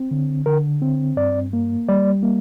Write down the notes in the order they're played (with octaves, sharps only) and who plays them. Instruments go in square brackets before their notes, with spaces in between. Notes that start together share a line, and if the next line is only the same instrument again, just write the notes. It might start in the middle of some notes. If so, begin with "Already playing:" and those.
Already playing: [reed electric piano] C4
D3
D3 A#4
C4
G2 D5
A#3
G3 D5
A#3